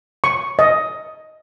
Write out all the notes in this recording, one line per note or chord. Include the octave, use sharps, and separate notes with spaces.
C#6
D#5